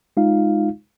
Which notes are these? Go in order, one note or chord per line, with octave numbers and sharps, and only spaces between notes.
G#3 D#4 F4 F5